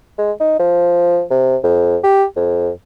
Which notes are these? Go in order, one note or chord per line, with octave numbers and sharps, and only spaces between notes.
G#3
D#4
F3
C3
F2
G4
F2